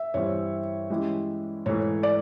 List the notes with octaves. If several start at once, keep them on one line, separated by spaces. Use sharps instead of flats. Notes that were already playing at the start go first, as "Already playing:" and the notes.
Already playing: E5
G2 E3 G3 C4 C#5
E3 G#3 C#4 E4 G4
G#2 E3 A3 C#5
D5